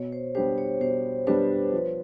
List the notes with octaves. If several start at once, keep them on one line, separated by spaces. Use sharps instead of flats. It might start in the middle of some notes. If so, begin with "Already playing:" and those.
Already playing: B2 C#5
C5
G3 B3 D4 G4 C5
C#5
B2 C5
G3 B3 D4 G4 B4
F3